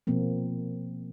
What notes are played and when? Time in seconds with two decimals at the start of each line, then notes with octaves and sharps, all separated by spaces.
0.07 B2 F3 A#3 C4